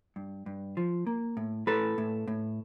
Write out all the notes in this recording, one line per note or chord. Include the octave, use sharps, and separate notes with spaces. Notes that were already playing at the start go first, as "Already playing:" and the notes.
G2
G2
F3
A#3
A2
A2 A4 B4
A2
A2